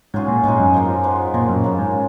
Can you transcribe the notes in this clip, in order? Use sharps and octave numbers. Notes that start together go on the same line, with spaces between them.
G#2 F#3 C#4 F4 G#4
A#2
G#2 B2 G#3 D#4 G#4
F#2
F3 A#3 F4
F3 G#3 B3
A#2 D#3 F#3 A#3
F#2
C#3 F3 A#3 F4
G#2